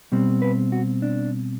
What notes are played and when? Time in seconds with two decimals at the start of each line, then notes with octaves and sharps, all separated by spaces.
0.12 B2 G3 C4
0.42 B4
0.72 F#4
1.02 D4